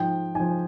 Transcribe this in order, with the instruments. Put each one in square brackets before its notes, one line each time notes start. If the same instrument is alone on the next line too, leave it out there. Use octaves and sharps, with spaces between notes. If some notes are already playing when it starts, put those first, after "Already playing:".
Already playing: [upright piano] G#2 F3 G5
G#2 F3 G#5